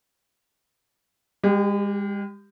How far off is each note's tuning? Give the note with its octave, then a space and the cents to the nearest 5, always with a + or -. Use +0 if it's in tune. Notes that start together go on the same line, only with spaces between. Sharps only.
G#3 -40 G4 +0